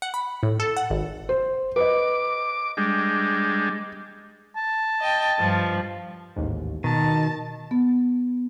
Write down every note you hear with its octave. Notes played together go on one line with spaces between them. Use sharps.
F#5
B5
A2
A4
F#5
G#1
C5
B4 D#5 D6
G3 G#3 D4
A5
D#5 G5
G2 F3
A1 D#2 G#2
B2 D#3 A5
B3